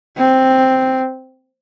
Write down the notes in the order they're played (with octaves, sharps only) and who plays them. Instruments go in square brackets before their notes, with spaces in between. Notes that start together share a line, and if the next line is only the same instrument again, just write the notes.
[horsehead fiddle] C4